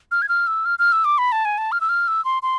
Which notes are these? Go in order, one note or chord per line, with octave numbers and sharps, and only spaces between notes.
F6
G#6
F6
E6
F6
F6
E6
D6
B5
A5
G#5
A5
F6
E6
F6
E6
C6
C6